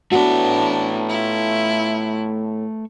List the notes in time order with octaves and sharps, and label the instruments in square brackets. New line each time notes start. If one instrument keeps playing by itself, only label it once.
[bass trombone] A2 [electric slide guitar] A3 B4 [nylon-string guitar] B3 F#4 [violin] D4
[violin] E4 F4